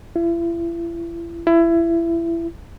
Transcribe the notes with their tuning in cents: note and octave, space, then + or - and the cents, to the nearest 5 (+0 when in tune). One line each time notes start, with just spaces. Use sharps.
E4 +40
E4 +25